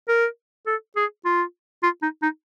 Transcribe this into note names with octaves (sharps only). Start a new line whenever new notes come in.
A#4
A4
G#4
F4
F4
D#4
D#4